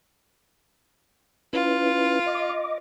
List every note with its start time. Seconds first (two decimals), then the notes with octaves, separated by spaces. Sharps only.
1.53 C#4 E4 F4 B4
2.26 D#5 D6